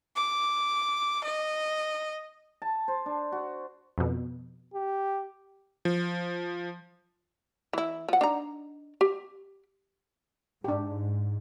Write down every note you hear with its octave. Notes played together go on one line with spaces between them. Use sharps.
D6
D#5
A5
C5
D4
F#4
F2 B2
G4
F3
E3 E4
F3 F#5
D4 D#4 A#5
G4
G#2 D4 G4